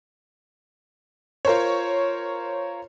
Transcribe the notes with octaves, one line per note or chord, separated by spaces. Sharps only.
F4 A#4 C5 C#5